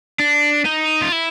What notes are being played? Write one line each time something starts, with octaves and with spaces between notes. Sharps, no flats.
D4
D#4
F4
E4